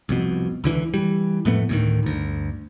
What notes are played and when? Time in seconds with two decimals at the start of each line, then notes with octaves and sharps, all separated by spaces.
0.09 C2 F2 B2
0.64 C#2 D3 E3
0.94 E3 G3
1.45 F2 A2 A3 B3
1.69 D2 A2 D#3
2.03 G1 D2